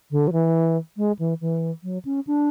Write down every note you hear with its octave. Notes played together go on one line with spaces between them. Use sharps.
D3
F#3
E3
G#3
E3
E3
F#3
C#4
D4